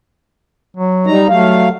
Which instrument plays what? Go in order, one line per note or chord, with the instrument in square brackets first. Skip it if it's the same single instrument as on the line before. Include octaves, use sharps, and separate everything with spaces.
[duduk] F#3
[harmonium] G3 D#4 A#5
[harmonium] F#3 F5 [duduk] A3